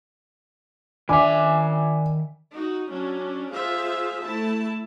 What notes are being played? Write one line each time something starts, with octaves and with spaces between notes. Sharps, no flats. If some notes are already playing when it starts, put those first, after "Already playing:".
D#3 D4 E5 G#5 D6
D#4 F#4
F#3 C#4 D4
F4 G#4 C5 E5 F5
A3 E4 A5